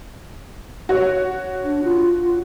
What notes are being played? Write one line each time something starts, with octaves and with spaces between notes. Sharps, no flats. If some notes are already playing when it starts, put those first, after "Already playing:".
F#4 C#5
D4
F4